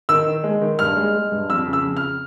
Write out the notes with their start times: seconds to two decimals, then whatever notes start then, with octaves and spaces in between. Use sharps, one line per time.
0.09 D#3 E6
0.26 D#3
0.44 G#3
0.61 D#3
0.79 G2 F6
0.97 G#3
1.14 G#3
1.32 G2
1.50 F2 E6
1.67 C#3
1.73 E6
1.85 F2
1.97 F6